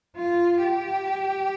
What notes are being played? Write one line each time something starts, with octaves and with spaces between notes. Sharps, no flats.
F4
G4